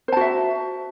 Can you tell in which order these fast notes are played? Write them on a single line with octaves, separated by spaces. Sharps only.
C5 A5 F#4 E5